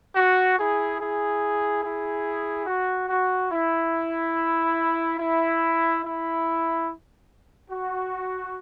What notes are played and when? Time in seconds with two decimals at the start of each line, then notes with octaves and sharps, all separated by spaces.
0.16 F#4
0.57 E4 G#4
1.00 E4 G#4
1.83 E4 G#4
2.67 F#4
3.09 F#4
3.52 E4
5.18 E4
6.03 E4
7.70 F#4